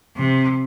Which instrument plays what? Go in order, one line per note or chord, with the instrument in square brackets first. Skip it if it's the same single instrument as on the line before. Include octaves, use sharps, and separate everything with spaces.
[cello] C3